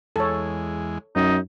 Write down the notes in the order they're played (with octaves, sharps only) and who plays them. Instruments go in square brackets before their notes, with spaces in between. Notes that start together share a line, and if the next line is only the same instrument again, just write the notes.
[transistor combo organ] E2 G#3 [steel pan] A4 C#5
[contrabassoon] F#2 [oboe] D#4